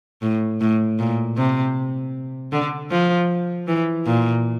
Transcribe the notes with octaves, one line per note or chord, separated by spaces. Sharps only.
A2
A2
A#2
C3
D3
F3
E3
A#2